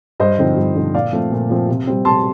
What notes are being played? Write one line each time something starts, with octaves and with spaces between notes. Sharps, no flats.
G2 C5 D#5
D3 F3 C4 D#4
G2
D3 F3 C4 D#4
A#2 D5 F5
F3 A3 C4
A#2
F3 A3 C4
C3
G3 C4
C3 A5 C6